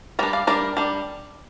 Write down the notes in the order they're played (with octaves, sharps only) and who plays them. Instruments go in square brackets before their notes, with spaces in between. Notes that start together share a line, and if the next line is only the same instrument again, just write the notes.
[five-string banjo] G3 A#4 D5
D4
D5 F5
G3 D4 A#4 D5
G3 D4